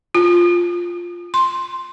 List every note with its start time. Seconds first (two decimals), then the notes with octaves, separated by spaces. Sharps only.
0.15 F4
1.34 C6